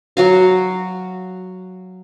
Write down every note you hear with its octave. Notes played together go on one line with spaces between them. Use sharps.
F#3 F#4 F5